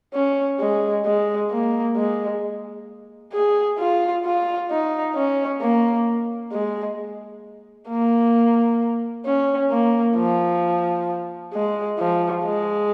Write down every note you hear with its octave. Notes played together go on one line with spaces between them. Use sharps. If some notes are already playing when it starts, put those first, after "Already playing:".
C#4
G#3
G#3
A#3
G#3
G#4
F4
F4
D#4
C#4
A#3
G#3
A#3
C#4
A#3
F3
G#3
F3
G#3